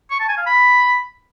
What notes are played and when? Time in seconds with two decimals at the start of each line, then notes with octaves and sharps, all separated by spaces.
0.11 C#6
0.20 A5
0.28 G#5
0.37 F5
0.46 B5